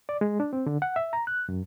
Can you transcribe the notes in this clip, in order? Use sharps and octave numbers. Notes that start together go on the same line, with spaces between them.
D5
G#3
D4
C4
D3
F#5
E5
A#5
F#6
F#2